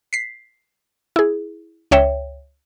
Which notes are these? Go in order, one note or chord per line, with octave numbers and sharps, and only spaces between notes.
B6 C7
E4 G#4
C#2 C#5 E5 G5